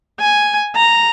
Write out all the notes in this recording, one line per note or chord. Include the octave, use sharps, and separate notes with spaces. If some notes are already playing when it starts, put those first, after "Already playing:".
G#5
A#5